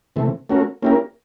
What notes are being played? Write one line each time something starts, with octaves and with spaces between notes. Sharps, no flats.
C3 E3 A3
A3 C#4 F#4 A#4
A#3 C#4 E4 G4 A#4